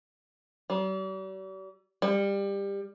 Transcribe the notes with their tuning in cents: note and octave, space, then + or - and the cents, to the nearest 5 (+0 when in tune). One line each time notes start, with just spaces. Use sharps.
G3 -45
G3 +20